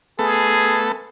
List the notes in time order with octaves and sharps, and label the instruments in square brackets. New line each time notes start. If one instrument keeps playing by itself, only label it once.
[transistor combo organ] A3 B3 A4 [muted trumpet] G#4